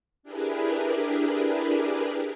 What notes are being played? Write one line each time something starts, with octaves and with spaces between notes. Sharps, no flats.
D4 E4 G4 G#4 A#4 B4